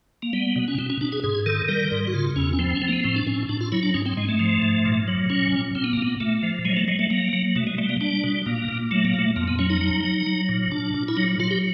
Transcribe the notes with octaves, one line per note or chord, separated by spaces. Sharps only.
A#3
G3 B3
B2
C#4
B2 C4
C#4
B2 D4
G#4
G#2 G#4
D#3 A4
G3 A#4
G#2
F#4
C#3 F4
E2 C#4
C#4
F3 C4
C4
C#4
F3 C4
A#3
B3
A2 C4
D4
A2 C#4
A2 D4
F4
F#3 E4
D4
G#2 C#4
C4
G#2 G#3
A3
F3
G#2
A#2
F#3
A#2 C#4
A#2
A#2 C4
B3
A#2 A#3
B3
A#2 A3
F3
F#3 G#3
A3
F#3 G#3
A3
F#3 A#3
F#3
B2 A3
G#3
G3 A3
A#3
G3 D4
B2
A#2 A#3
A#2
F#3 A3
A#3
A#2 A3
F2 A#3
B3
F#3 C#4
D#4
F#3
F#3
F#3
A#2
A#2 D4
A#2
E4
F#3 D#4
F#3 F4
G4